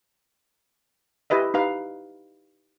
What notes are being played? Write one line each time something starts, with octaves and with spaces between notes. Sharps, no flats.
E4 G4 B4 D#5 E5
D#4 G4 B4 F5